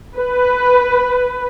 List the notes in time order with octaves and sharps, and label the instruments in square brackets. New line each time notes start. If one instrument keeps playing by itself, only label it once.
[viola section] B4